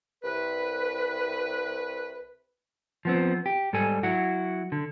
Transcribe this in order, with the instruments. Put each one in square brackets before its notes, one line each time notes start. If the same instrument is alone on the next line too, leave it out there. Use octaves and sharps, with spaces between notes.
[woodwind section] C2 B4
[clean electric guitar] F3 B3 C4
G4
G#2 G3 A4 G#5
F#3 E4 F#4
D3